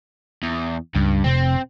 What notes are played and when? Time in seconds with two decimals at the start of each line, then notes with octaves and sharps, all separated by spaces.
0.43 E2
0.95 C#2 G2
1.24 F1 C3 C4